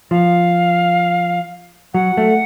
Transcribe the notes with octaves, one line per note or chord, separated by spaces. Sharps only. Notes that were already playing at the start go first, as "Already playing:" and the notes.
F3 F5
F#3 F#5
A3